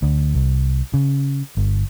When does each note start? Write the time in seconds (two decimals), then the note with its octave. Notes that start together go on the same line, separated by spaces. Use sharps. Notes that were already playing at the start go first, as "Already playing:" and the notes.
0.03 D2
0.35 C2
0.94 C#3
1.57 G1